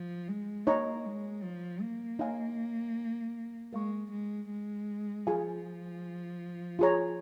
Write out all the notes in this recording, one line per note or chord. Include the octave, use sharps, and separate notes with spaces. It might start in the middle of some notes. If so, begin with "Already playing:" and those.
Already playing: F3
G#3
A#3 D#4 C#5 A#5 C#6
G#3
F3
A#3
D#4 C#5 F5 G#5
G#3 A#4 F5 C#6
G#3
G#3
F3 F4 G#4 F5 G#5
F4 G#4 C#5 A#5